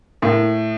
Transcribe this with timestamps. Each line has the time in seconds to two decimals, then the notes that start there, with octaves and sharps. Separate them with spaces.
0.22 A2 A#3